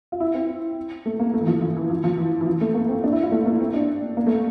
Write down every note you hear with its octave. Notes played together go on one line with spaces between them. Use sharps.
F4
E4
C4
A3
A#3
A3
E3
F3
F3
E3
F3
F3
E3
E3
F3
A3
A#3
C4
D4
E4
F4
A3
A#3
C4
D4
A#3
A3